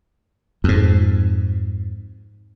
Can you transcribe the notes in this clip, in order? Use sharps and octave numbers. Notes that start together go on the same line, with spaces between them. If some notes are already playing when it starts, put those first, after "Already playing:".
F2 G#2